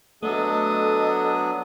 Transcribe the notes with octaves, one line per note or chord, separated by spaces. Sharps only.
F#3 A3 B3 D4 A4 D#5 D#6